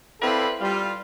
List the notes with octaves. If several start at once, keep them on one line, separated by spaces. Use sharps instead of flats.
C4 E4 A4 B4 D5 F5
G3 F4